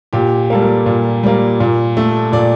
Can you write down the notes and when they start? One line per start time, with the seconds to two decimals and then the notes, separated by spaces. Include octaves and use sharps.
0.13 A#2 G4
0.50 G3 A#3 A4
0.62 A#4
0.86 A#2
1.23 G3 A#3
1.60 A#2
1.97 A3
2.32 A#2 D5